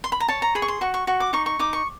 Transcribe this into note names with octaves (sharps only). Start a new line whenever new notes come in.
C6
B5
A#5
C#5 A5
A#5
G#4 B5
C#6
C6
F#4 C#6
C#6
F#4 C#6
D6
D#4 C#6
C#6
D#4 D6
C#6